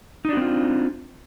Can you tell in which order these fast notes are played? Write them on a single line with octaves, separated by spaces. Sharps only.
D#4 D4 F#4 C4 F4